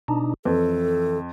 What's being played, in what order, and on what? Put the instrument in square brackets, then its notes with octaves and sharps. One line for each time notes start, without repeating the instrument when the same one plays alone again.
[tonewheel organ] B2 D4 D#4
[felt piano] F2 [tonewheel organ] E3 [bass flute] A4